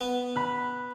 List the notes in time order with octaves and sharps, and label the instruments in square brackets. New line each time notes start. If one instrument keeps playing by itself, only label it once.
[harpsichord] B3
[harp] B5 F#6